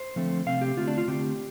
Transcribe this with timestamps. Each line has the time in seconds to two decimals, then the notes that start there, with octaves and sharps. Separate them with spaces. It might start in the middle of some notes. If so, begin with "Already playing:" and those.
Already playing: C5
0.16 D3 F3 A3 C4
0.46 C3 A3 C4 F5
0.61 G4
0.77 D3 A3 C4 F4
0.87 D4
0.98 F4
1.07 D3 A3 C4 G4